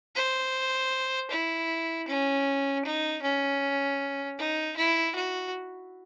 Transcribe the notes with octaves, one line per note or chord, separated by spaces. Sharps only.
C5
E4
C#4
D#4
C#4
D#4
E4
F#4